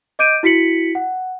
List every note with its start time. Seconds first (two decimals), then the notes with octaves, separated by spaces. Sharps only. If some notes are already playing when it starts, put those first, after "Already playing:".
0.19 D#5 D6 G6 D7 D#7
0.43 E4 F#4 B6 C#7 F#7
0.95 F#5